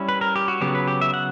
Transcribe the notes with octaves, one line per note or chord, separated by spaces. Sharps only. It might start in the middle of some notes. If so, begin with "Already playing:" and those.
Already playing: G3 C#4 E4
B4
A#4
G4
F#4
C#3 F#3 B3 G4
B4
G4
E5
F#5